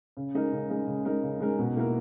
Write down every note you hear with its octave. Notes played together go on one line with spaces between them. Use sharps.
C#3
G#3 D#4 A#4
C#3
G#3 D#4 A#4
C#3
G#3 D#4 A#4
C#3
G#3 D#4 A#4
B2
A#3 E4 A#4